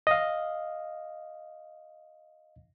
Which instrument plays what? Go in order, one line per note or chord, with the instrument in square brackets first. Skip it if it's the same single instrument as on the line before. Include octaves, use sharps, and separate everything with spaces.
[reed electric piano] D#5 F5